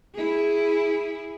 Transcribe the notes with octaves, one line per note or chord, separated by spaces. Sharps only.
E4 G#4